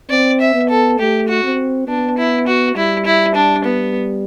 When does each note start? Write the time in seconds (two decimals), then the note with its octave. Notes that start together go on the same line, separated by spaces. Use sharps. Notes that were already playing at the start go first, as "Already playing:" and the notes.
0.10 C4 D5
0.40 E5
0.54 B3
0.69 A4
0.99 A3 G4
1.28 F#4
1.43 C4
1.88 B3 D4
2.18 E4
2.47 F#4
2.76 G3 E4
3.05 E4
3.35 D4
3.65 B3